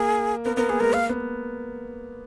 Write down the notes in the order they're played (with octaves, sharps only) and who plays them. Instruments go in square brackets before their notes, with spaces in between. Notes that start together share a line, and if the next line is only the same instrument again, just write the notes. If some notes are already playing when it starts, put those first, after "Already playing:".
Already playing: [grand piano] A#3 [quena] G#4
[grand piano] B3 [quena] A#4
[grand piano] B3 [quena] A#4
[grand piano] A#3 [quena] G#4
[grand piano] G#3 [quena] A#4
[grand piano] A#3 [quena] F5
[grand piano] B3